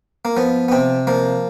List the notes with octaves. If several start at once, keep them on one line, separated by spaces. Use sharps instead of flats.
A#3
F3 B3
B3
C3 C4
F3 A#3